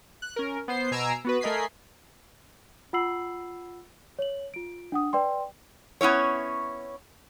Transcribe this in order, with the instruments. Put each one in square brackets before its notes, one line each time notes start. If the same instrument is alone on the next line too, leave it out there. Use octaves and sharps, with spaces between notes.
[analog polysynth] F#6
C#4 A#4
B3 C5 C7
B2 G#5 A#5 E6 C7 D7
B3 F#4 B4
A3 A#4 D#5 G#5 B5 C7
[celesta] F4 F#5 B5 E6 C7 F#7
C#5 F#7
F4 D7
D4 F#5 D#6
B4 D5 G5 C6
[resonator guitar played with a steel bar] B3 C#4 E4 C#5